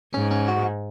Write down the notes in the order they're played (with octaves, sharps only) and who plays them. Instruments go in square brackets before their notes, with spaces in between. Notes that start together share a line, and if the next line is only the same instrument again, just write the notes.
[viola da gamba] G#2 [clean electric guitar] C#4
[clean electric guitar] C#4
F#4